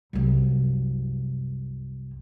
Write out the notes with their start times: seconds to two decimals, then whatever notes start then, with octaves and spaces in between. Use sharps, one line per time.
0.13 C2 F#2